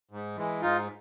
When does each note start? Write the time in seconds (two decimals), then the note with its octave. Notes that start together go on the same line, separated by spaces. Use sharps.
0.11 G#2
0.36 E3 G#3
0.62 G#2 D#4 F4